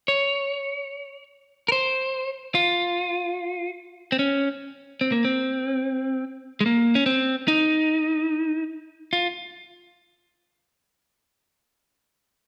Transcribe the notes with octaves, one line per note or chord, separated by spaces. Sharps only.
C#5
A#4
C5
F4
C4
C#4
C4
A#3
C4
G#3
A#3
C#4
C4
D#4
F4